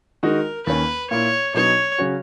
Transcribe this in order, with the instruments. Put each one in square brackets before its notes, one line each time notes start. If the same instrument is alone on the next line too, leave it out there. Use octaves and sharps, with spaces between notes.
[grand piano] D#3 G#3 D#4 F#4 [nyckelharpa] A#4
[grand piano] D#2 D#3 A#3 C#4 [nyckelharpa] B4
[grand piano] A#2 A#3 E4 [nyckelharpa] C#5
[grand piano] B2 F#3 B3 D#4 [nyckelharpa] C#5
[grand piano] C#3 F#3 C#4 F#4